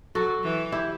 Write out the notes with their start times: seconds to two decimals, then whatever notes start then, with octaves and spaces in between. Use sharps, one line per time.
0.15 F#3 F#4 A4
0.43 E3
0.72 E4 G4